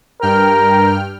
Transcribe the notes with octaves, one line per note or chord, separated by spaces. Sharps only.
G2 A#4 G5 F6